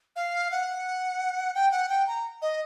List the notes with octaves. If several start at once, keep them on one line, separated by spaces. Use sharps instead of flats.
F5
F#5
G5
F#5
G5
A#5
D#5